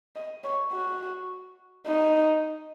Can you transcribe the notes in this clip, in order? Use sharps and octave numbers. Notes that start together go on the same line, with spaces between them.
D#5
C#5
F#4
D#4